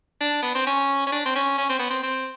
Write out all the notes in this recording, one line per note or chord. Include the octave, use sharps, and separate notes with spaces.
D4
B3
C4
C#4
C#4
D4
C4
C#4
C#4
C4
B3
C4
C4